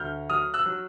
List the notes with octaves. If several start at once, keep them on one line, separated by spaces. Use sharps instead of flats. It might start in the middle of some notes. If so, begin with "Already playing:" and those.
Already playing: D2 F6 G6
F#3 D#6 F6
E6 F#6
F#3